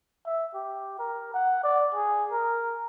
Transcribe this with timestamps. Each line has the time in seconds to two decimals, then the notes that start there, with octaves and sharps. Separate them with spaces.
0.26 E5
0.55 G4
0.99 A#4
1.34 F#5
1.64 D5
1.95 G#4
2.32 A#4